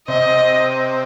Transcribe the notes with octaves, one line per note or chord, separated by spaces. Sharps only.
C3 D#5